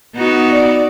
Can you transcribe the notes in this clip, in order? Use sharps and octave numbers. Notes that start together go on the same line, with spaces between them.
B3 D#4 F#4
D5